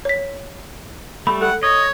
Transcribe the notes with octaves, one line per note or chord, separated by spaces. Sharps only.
C#5 B6
G3 A3 B5
A4 F#5
C#5 D#5